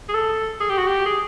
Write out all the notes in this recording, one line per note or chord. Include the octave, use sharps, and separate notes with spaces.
G#4
A4
G#4
G4
F#4
G4
G#4